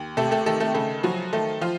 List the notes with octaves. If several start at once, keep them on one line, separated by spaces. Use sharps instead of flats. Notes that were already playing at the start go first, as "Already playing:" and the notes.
Already playing: D#2
C3 A3 A4
A3 A4
D#3 A3 A4
A3 A4
C#3 A3 A4
F3 F#3 F#4
D#3 A3 A4
F3 F4